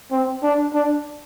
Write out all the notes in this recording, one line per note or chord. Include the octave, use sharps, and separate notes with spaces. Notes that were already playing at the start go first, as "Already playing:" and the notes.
C4
D4
D4